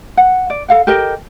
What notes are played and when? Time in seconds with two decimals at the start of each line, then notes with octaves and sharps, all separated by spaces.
0.17 F#5
0.50 D5
0.68 A4 F5 F#5
0.87 G4 A4 A#4 D#5